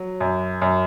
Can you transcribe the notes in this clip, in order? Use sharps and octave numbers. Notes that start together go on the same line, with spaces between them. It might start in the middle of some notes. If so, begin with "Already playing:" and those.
Already playing: F#3
F#2
F#2